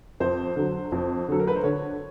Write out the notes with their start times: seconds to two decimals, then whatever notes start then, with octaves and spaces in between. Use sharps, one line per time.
0.20 F2 C5
0.56 D3 F#3
0.92 F2
1.28 D3 F#3 A4
1.39 A#4
1.47 B4
1.56 C5
1.63 D3 C#5